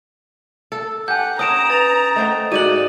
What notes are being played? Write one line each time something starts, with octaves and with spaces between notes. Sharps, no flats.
A4
G4 F#5 G#5 A5 G6
C#4 C#5 A#5 D#6 D7 E7
B4 A6 F7
A3 C5 D#5 F#5 G5
G#2 D#4 F#4 D5 D#5 F#5 D#7 F#7